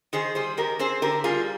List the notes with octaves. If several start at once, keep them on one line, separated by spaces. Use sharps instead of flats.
D#3 G#4 C5
G3 G#4 C5
D#3 G4 A#4
C4 G#4 C5
D3 G4 A#4
G3 F4 G#4